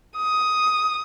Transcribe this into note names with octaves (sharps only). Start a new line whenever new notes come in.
D#6